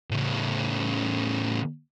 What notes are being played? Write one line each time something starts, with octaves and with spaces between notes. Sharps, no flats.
A2 C#3